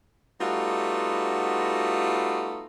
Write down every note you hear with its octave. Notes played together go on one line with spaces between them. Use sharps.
G3 A3 B3 D#4 F4 F#4